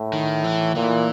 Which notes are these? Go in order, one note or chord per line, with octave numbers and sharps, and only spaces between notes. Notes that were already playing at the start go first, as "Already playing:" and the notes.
Already playing: A2
D#3
E3
A#2 E3